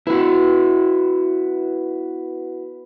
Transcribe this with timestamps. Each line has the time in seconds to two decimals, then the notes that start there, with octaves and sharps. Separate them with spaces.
0.07 B3 E4 F#4 B4